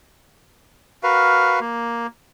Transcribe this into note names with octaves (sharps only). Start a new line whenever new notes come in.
F#4 A#4 B4 F5
A#3